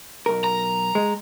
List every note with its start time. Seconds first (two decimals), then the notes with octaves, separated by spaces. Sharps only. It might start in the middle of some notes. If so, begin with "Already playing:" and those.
0.26 B1 A#4
0.44 A#5
0.95 G#3